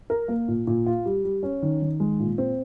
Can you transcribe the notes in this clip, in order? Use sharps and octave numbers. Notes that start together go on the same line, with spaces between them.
A#4
A#3
A#2
A#2
F4
G3
G3
C#4
D#3
D#3
G#3
A#2
C4